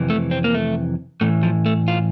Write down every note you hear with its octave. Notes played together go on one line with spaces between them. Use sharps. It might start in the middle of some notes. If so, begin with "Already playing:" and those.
Already playing: F2 C3 E3
A3
C4
A#3
A3
A2 E3 A3
F3
A3
F4